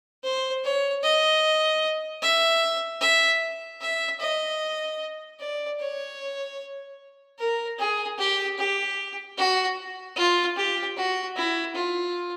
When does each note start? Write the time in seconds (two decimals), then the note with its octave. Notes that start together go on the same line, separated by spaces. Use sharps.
0.23 C5
0.64 C#5
1.03 D#5
2.22 E5
3.01 E5
3.81 E5
4.20 D#5
5.40 D5
5.80 C#5
7.39 A#4
7.79 G#4
8.18 G4
8.58 G4
9.37 F#4
10.16 F4
10.56 G4
10.96 F#4
11.36 E4
11.75 F4